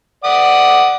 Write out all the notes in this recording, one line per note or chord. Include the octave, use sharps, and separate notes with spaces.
D5 F#5 D#6